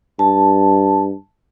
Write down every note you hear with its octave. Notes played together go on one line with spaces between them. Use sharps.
G2 A5